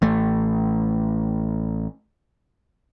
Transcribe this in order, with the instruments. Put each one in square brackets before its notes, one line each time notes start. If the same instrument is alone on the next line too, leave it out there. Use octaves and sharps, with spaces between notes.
[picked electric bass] A1 A3